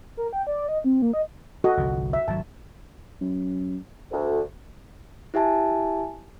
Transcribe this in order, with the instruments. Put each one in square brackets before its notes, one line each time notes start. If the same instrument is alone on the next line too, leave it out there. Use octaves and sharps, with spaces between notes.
[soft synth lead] A#4
G5
D5
D#5
C4
A#3
D#5
[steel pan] F#4 A4 D#5
[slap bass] G1 C2 F3
[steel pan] E5
[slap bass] G#1 F#3 [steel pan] A5
[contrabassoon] F#2
[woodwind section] D2
[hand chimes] E4 G4 E5 G#5 A5